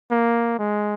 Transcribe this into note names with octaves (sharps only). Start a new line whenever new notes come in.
A#3
G#3